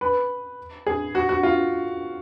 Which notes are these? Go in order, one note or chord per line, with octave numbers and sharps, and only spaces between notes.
B4
G#4
F#4
F#4
F4